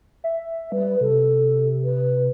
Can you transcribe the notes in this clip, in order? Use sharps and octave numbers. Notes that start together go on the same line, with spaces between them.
E5
G3 B4
C3 A4
B4